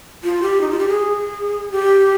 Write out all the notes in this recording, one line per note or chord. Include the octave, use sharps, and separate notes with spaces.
F4
G4
D#4
F4
G4
G#4
G4